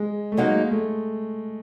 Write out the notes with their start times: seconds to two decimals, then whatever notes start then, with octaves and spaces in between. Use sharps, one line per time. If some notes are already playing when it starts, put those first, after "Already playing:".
Already playing: G#3
0.32 A3
0.37 F#3 G#3 A#3 D#4
0.71 A3